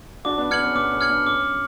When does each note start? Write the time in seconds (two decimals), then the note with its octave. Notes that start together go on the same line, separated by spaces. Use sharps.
0.25 D4 F#4 D6
0.38 B3 D4
0.50 B3 D4 F6 G#6 C#7 F#7
0.64 C#4
0.75 B3 D6
0.93 C#4
1.01 F6 G#6 C#7 F#7
1.09 B3 D4
1.27 C#4 D6